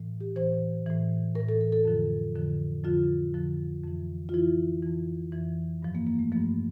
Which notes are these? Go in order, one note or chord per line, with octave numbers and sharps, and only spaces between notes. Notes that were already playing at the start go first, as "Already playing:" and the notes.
Already playing: A2 E3
G4
A2 E3 C5
A2 E3
A2 A#4
E3
A4
A4
A4
F2 D3 F3
F2 D3 F3
F2 D3 F3 F4
F2 D3 F3
F2 E3
F4
F2 E3 E4
F2 E3
F2 E3
G2 F3
A#3
A#3
A3
G2 F3 A#3